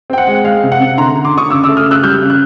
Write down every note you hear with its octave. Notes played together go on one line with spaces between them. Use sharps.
C4 G5
F#5
G#3
G#3 F5
C3
F#5
C3
D3 A#5 C6
D3
C6 D6
D3 C#6 D#6
C#3 D6 E6
D6 E6
A3
D#6 F6
C#3
E6 F#6
G3 F6 G6
C#3
F#6